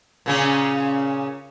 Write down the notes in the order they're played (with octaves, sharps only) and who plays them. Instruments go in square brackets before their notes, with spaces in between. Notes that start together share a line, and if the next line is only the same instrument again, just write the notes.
[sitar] A#2 C#3 C#4